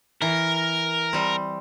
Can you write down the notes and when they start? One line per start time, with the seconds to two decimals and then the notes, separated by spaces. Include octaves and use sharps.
0.22 E3 A#4
1.13 G3 C4